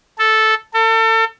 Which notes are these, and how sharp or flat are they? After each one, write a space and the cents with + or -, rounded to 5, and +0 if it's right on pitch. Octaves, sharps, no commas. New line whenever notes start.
A4 -5
A4 +35